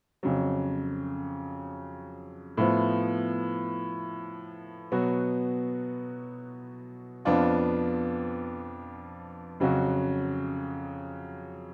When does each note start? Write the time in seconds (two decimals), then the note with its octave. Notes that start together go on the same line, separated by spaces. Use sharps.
0.23 F2 C#3 F#3
2.57 A2 F3 B3
4.92 B2 F#3 B3 F#4
7.25 F2 F3 B3 D4 F4
9.60 F2 C#3 F#3 C#4 F#4